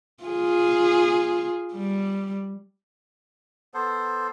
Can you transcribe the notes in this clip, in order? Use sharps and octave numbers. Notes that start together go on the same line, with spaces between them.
F4 G#4
G3
B3 A4 C5